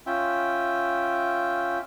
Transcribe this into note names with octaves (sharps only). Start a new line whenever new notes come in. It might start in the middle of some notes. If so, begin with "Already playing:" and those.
C#4 F4 E5 G5